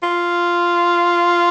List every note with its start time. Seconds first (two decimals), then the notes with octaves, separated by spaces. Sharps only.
0.03 F4